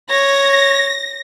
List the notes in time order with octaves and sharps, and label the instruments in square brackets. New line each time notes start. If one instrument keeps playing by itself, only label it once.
[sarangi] C#5 [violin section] A#6